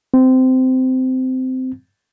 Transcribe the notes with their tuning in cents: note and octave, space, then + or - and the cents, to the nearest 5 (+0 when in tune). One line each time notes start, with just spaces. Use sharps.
C4 -20